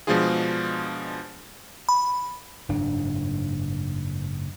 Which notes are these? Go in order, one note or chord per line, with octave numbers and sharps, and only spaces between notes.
B2 F3 G#3 D4 F4 G#4
B5
F#1 G#2 D4